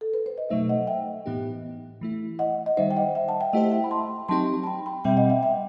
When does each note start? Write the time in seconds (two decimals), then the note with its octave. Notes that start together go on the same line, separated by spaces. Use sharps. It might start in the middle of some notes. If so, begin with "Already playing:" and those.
0.01 A4
0.14 B4
0.26 C5
0.38 D#5
0.49 B2 F#3 A3 D#4 C5 E5
0.69 D#5 F#5
0.87 E5 G5
1.26 A2 E3 B3 D#4 G4
2.01 E3 A3 E4
2.39 D#5 F#5
2.66 D#5
2.77 D#3 G3 D#4 C5 E5
2.91 G5
2.97 D#5 F#5
3.15 E5 G5
3.28 F#5 A5
3.40 E5 G5
3.53 A3 E4 G4 C5 D#5 F#5
3.72 E5 G5
3.84 B5
3.91 A5 C6
4.29 F#3 C4 D#4 G4 A5 C6
4.63 A5
4.67 G5 B5
4.86 G5 B5
5.05 B2 G3 C4 E5 G5
5.17 D#5 F#5
5.30 E5 G5
5.42 E5 G5